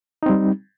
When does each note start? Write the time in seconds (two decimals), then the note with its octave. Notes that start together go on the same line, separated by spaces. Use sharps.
0.23 D#4
0.26 C4
0.29 G3